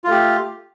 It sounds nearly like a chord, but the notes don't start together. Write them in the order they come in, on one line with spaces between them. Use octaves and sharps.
F4 A3 G4